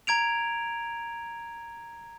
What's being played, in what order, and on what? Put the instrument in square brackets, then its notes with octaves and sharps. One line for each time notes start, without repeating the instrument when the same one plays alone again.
[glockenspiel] A#5 G#6 D7 F7